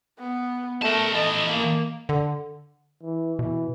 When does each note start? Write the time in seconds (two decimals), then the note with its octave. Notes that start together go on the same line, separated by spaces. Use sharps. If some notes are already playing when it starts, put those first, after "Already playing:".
0.19 B3
0.82 A3 A#4 A5
1.15 E3 A4 D#5
1.50 A#3
2.09 D3
3.03 E3
3.39 B2 E3